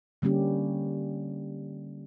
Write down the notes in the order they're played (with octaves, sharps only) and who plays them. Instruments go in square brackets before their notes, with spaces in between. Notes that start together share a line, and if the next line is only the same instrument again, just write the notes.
[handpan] D3 G3 A#3 C#4 G4